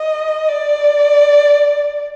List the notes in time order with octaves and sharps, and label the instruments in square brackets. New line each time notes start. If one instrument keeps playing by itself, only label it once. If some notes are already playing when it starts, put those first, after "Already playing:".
Already playing: [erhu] D#5
D5